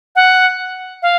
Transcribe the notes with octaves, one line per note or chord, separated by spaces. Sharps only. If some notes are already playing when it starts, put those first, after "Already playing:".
F#5
F5